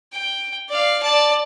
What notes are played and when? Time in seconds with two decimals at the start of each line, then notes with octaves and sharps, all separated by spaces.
0.13 G5
0.70 D5 F5
1.02 D5 A5